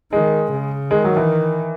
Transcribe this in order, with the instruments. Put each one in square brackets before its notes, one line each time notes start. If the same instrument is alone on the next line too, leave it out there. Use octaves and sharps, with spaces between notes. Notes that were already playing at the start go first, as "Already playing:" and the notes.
[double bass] D#3 [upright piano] G#3
[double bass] C#3
[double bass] D#3 [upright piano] G#3
[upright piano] F#3
E3